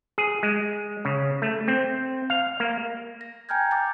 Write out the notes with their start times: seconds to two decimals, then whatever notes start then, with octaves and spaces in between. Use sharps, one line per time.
0.18 G#4
0.43 G#3
1.05 C#3
1.42 A3
1.68 C4
2.30 F5
2.60 A#3
3.21 A#6
3.49 G5 G#5 A#5 F6 G6 G#6
3.71 D6 F6 G6 A6